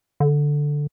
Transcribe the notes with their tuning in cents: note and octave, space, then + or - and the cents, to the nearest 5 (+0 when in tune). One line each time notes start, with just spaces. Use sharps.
D3 +0